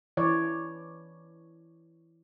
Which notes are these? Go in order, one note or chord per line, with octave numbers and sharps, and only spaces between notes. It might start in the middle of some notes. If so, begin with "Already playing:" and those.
E3 C#5 D5